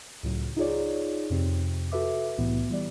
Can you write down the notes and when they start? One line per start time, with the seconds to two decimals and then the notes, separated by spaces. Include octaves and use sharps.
0.23 C#2 A2 F#3
0.57 D#4 F4 G#4 C#5 D5
1.30 F2 C3 C4
1.92 F#4 A4 B4 E5 D6
2.38 C2 A2 E3 B3
2.69 E3 G3 D5